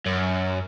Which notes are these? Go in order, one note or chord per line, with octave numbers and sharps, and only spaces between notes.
F#2